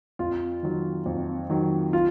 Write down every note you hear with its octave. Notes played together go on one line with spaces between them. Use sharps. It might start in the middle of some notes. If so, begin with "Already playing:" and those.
F2 F4
D#3 F#3
F2
D#3 F#3
F4